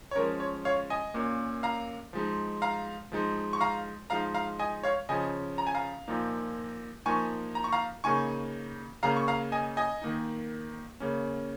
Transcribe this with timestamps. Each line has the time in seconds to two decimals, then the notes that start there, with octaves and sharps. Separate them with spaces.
0.11 C#5
0.15 F3 G#3 C#4 A#4
0.40 C#5
0.65 C#5 F5
0.90 D#5 G#5
1.14 A#2 A#3 C#4
1.63 F5 A#5
2.13 F3 G#3 D#4
2.62 F5 A#5
3.12 F3 G#3 D#4
3.53 C#6
3.61 F5 A#5
4.10 F3 G#3 D#4 F5 A#5
4.34 F5 A#5
4.59 D#5 G#5
4.83 C#5 F5
5.09 C#3 F3 C#4 D#5 G#5
5.58 A#5
5.67 G#5
5.75 F5 A#5
6.08 A#2 F3 A#3 D#4
7.06 F3 A#3 D#4 G#5 C#6
7.55 A#5
7.64 C#6
7.72 F5 A#5
8.04 C#3 A#3 D#4 G#5 C#6
9.03 C#3 A#3 C#4 F5 A#5
9.17 C#6
9.28 F5 A#5
9.52 D#5 G#5
9.77 D#5 G#5
10.02 D#3 A#3 D#4
11.00 C#3 A#3 C#4